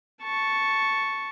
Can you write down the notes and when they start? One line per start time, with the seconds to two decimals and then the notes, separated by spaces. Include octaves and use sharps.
0.23 A5 C#6